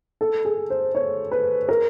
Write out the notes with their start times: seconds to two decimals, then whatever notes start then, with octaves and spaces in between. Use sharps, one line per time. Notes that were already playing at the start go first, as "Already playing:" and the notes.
0.21 A4
0.45 G#4
0.70 C5
0.95 C#5
1.32 B4
1.69 A#4